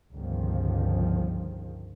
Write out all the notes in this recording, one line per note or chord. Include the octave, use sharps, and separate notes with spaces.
G1 C#2 D#3 F3